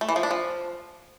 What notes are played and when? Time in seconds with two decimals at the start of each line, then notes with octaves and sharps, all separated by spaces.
0.01 A3
0.09 E3
0.16 F3
0.23 D4
0.31 F3